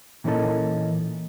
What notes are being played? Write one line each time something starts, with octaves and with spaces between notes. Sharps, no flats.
A#2 E3 A#3 C#4 D#4 A4